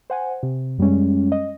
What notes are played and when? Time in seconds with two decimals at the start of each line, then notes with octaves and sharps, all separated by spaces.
0.10 C5 F#5 G#5
0.43 C3
0.78 F#2 G3 G#3 C#4
1.32 D#5